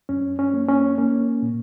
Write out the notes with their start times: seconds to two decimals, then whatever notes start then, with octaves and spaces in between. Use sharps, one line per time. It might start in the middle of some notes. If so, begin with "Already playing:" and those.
0.09 F#2 C#4
0.39 C#4
0.54 A#3
0.69 C#4
0.98 A#3 C#4
1.42 A#2